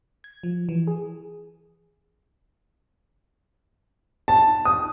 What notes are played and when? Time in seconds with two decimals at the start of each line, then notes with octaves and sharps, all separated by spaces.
0.24 G#6
0.43 F3
0.69 E3
0.87 G#4
4.28 A5
4.65 D#6